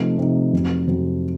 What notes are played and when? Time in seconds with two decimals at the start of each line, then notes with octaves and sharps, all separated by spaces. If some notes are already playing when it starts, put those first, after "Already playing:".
Already playing: C3 F3 A3 D#4
0.18 C3 F3 A3 D#4
0.53 F2 C3 F#3
0.87 F2 C3 F#3